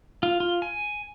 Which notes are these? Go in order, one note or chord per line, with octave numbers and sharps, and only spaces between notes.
F4
F4
G#5